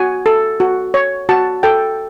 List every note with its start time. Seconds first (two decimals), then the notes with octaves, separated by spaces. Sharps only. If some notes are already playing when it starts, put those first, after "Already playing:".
Already playing: F#4 G#5
0.26 A4
0.60 F#4
0.94 C#5
1.29 F#4 A5
1.63 A4 G5